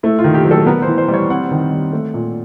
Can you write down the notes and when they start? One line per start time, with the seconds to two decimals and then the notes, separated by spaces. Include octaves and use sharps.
0.03 A3 E4
0.19 F4
0.24 D#3
0.34 G4
0.45 F#3
0.51 A4
0.66 B3 A#4
0.82 C5
0.87 E3
0.98 C5
1.08 G3
1.14 C#5
1.30 C4 F#5
1.51 D#3
1.72 G3
1.93 A3
2.14 A#2